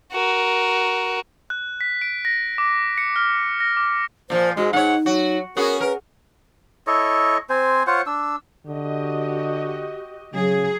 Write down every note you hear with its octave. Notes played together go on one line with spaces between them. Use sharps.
F#4 A#4
F#6
B6
D7
A#6
D6
C#7
F6
A#6
D6
A#2 F3 C5
G#2 G#3 F#4
G#2 D#4 C#5 F#5
F#3 F#4
B3 C#4 F#4 G#4 A#4
A#4 B4
E4 A4 C#5 D#5
C4 C5 G#5
F4 C5 C#5 F#5
D4 E6
D3 F#4 G4 D#5
C#3 F#3 G#4